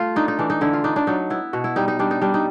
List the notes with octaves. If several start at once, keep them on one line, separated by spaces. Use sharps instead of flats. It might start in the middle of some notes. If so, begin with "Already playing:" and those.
Already playing: A3 F4
D4 D#4
D#4
E3 D4
D#4
D3 E4
F4
D4 D#4
D4
F#3 D#4
B3 E4
B2 F#4
E4
G3 D#4
D#4
G3 D4
D#4
G3 D4
D#4